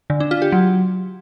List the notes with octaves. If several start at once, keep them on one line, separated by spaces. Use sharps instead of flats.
D3
D4
F4
G4
F#3